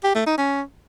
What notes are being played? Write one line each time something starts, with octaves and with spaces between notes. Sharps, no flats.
G4
A3
D#4
C#4